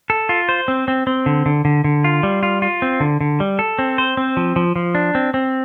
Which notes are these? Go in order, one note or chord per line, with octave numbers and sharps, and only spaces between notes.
A4
F4
C5
C4
C4
C4
D3
D3
D3
D3
F4
G3
F4
F4
C4
D3
D3
G3
A4
C4
C5
C4
F3
F3
F3
D4
C4
C4